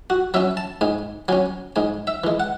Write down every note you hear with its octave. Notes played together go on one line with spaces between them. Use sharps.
F#4
F#3 C#4 E5
A5
G#2 G#5
F#3 C#4 G#5
G#2 G#5
E5
E3 G#3
F#5